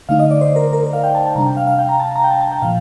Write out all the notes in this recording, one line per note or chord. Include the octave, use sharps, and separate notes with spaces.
D3 A3 D#4 F5
D#5
D5
C5
A#4
A#4
A#4
F5
G5
A5
A5
C3 G3 D4 A#5
G5
F5
F5
G5
A#5
A5
A#5
G5
A5
A5
G5
A#2 F3 F5